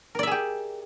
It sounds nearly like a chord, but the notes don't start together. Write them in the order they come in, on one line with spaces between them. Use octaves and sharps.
A#4 D5 E5 G#4 G4